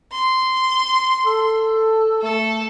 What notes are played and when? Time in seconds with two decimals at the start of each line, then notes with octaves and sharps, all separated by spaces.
0.12 C6
1.26 A4
2.22 A3 A4